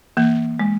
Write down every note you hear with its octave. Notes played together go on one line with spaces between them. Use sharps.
E3 A#3
G#3